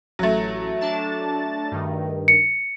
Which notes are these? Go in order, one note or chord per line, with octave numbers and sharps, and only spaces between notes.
A1 F#3 A3
D4 A5 A6
G2 D#3
C#7